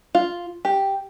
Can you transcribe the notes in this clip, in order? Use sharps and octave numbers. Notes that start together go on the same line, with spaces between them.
F4
G4